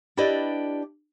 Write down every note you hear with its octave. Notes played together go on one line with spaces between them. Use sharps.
D4 E4 G4 B4 D5 D#5